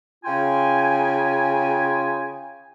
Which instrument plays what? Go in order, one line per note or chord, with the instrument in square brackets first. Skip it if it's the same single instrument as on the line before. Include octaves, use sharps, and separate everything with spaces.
[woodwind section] C#3 F4 G5 G#5